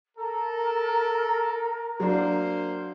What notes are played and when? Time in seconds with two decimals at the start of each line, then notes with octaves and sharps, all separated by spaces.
0.17 A4 A#4 A#5
2.00 F#3 A#3 D4 C5